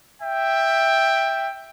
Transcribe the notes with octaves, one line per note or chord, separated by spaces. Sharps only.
E5 G5